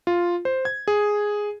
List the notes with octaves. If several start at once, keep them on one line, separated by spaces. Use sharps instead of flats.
F4
C5
G#6
G#4